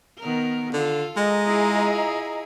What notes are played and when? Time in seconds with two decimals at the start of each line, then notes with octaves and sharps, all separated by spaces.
0.20 D#3 B3 A#4
0.73 D3 F4 A4
1.17 G#3 D#5 A#5
1.47 E4 F4 G#4